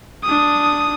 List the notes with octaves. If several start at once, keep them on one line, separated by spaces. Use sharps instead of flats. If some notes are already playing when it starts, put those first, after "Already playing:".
D4 D#6